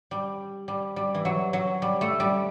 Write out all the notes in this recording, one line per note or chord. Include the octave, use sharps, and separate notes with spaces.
G3
G3
G3
E3
F#3
F#3
G3
A3
G3